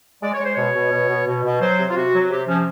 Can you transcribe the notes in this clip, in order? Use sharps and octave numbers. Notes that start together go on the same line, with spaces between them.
G#3 D5
C#5
G#3 C5
B2 C#5
B2
B2
B2
B2
B2
F#3 C5
C3
F4
C3 F#4
F#3
C3 G4
F3 C#4